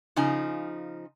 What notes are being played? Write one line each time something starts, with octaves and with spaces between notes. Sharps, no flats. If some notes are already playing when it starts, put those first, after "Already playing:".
C#3 F3 D#4 G#5